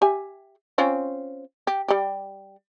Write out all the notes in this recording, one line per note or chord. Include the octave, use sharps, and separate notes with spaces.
G4 E5 G#5
C4 C#4 F4
G4
G3 G4